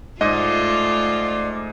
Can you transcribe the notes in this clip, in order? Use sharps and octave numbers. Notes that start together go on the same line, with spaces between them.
G#2 A3 F4 D5 D#5